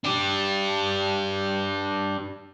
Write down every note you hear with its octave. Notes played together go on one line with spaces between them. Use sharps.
D4 G4